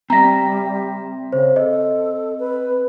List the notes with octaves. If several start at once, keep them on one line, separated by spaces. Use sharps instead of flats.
G3 C4 E5 A#5 A#6
C#3 C5
A4 D#5
B4